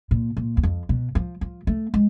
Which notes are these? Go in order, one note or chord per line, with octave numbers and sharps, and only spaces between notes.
A#2
A#2
E2
F2
B2
F3
F3
A3
G#3